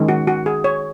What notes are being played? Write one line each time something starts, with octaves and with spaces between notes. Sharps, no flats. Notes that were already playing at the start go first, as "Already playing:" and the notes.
Already playing: D#3 G#3 C#4
F#4
F#4
G#4
C#5